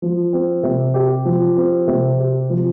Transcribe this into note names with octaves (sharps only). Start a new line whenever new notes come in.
F3
C4
C3
G4
F3
C4
C3
G4
F3